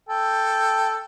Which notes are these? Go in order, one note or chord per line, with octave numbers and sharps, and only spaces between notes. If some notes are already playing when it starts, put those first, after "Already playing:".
A4 G5